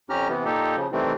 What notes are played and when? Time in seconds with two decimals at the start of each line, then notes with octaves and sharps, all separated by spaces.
0.10 F2 C#4 G4 A#5 F6
0.29 C3 E3 B3
0.45 A#2 A#3 D#4 G4 A4
0.77 C#3 F3
0.92 C3 D#3 E3 G3 A3 C4